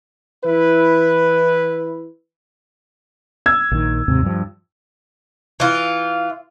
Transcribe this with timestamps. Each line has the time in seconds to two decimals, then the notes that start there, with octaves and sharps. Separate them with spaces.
0.45 E3 E4 B4
3.46 E6 G#6
3.71 A#1 D#3
4.08 D#2 G#2 C3
4.22 G2 F3
5.60 E3 F4